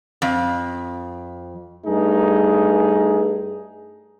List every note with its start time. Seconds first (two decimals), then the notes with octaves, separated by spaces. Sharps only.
0.22 F2
1.86 G2 A3 D#4 G#4